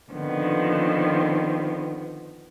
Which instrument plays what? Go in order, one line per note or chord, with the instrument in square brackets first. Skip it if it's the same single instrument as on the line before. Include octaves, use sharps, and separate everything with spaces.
[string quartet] D3 D#3 F3 B3 C4